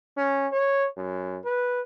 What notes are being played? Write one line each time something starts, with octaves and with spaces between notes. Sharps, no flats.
C#4
C#5
F#2
B4